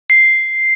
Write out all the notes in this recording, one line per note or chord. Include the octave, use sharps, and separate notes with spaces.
C7